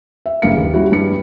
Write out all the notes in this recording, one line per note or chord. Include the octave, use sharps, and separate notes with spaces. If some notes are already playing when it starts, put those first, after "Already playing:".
E5
F#1 G2 A#3 F5 C#7
D#2
G3 C#4 E4 F#4
G2 C#7